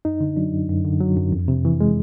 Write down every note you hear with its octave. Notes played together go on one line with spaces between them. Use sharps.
F#2 D#4
D3
F#3 D4
F#2
F#2
D3
F#3
F#2
F2
C3
E3
G#3